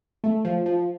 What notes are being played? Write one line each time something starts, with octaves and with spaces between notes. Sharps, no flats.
A3
F3
F3